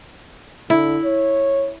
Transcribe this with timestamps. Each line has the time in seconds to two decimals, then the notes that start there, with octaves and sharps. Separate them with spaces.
0.70 D3 E4
1.04 C#5